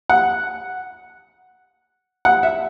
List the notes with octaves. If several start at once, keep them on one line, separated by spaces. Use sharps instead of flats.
F#5
F#5
E5